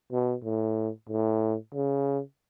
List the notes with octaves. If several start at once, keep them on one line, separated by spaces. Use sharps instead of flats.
B2
A2
A2
C#3